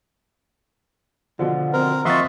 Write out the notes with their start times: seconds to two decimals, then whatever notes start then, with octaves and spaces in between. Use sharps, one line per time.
1.39 B2 D3 F3
1.73 C4 A#4
2.05 F2 F4 D#5 E5 F#5 C6 C#6 A6